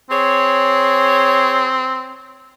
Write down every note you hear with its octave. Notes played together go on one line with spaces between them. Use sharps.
C4 G#4 C#5